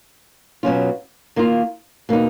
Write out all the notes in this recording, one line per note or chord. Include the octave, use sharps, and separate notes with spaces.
B2 F#3 C#4 F4
D#3 A#3 F4
B2 A#3 D#4